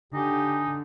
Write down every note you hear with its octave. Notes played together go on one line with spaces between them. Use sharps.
D3 D#4 G4 G#5